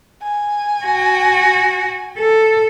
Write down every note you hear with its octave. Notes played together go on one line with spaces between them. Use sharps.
G#5
F#4
A4